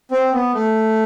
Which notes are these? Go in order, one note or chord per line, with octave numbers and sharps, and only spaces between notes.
C4
B3
A3